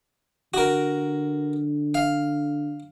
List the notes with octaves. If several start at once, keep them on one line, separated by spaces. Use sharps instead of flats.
D3 F#4 A#4
F5